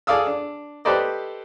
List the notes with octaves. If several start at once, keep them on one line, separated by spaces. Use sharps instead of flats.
G#4 A4 D5 F5 D#6 E6
D4
G4 A4 B4 C5 D5 D#5